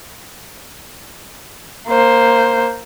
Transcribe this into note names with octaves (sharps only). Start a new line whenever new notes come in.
A#3 C5